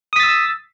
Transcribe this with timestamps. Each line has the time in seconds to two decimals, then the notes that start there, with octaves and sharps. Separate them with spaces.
0.13 D#6
0.16 B6
0.20 A6
0.23 E6